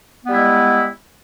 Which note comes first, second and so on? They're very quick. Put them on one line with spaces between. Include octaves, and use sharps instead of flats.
B3 G3 E4 G#3